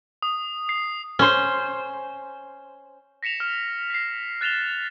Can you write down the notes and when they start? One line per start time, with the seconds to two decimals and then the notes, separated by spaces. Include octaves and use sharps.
0.22 D#6
0.69 C7
1.19 C#4 C5
3.23 A#6 B6 C#7 E7 F7
3.40 F6
3.90 B6 C7
4.41 F#6 A6 E7 F7 G7